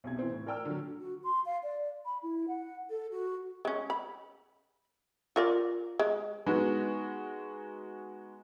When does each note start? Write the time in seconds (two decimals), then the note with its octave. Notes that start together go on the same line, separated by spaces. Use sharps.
0.04 B1 C3 G#6
0.19 E3 C4
0.31 A2
0.47 A#4 D5 G5 E6 F6
0.65 D3 F#3
1.00 F#4
1.24 C6
1.46 F5
1.63 D5
2.05 B5
2.23 E4
2.48 F#5
2.90 A4
3.11 F#4
3.65 G#3 C#4
3.90 B5
5.36 F4 A#4 D5
6.00 G#3
6.46 G#3 B3 D#4 F#4